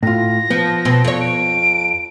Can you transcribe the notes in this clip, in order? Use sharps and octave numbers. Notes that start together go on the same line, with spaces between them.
A2 F4 A#6
F3 B3
B2 C4
F2 C#5
D7